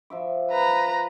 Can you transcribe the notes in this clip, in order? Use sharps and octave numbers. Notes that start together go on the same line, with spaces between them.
F3 E5 D6
B4 A#5